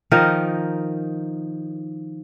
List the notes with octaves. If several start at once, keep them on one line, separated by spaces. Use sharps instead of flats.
D#3 F3 D#4 A#4